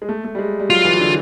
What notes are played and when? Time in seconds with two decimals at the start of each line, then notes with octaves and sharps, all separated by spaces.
0.02 G#3
0.09 A3
0.24 A3
0.35 G3
0.39 G#3
0.60 G3
0.70 F#3 F4
0.85 E3
0.99 D3